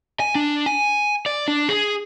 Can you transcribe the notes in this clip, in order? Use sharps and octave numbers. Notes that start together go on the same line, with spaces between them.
G#5
D4
G#5
D5
D4
G#4